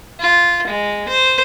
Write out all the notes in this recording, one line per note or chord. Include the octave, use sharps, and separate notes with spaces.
F4
G#3
C5